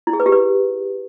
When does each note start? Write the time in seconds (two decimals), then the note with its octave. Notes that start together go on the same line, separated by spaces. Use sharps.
0.07 E4
0.13 G#4
0.20 B4
0.26 G4
0.32 B4